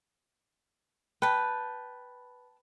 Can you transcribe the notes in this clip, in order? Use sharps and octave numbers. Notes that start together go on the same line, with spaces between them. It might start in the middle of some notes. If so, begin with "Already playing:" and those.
B4 G5 A5